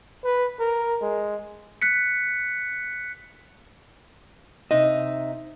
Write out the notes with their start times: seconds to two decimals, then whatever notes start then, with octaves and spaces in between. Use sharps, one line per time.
0.24 B4
0.59 A#4
1.01 G#3
1.82 F#6 B6 C#7
4.71 C3 D#4 D#5 E5